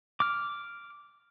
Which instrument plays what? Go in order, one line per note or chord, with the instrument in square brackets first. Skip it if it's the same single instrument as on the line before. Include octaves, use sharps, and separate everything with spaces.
[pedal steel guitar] D6 F6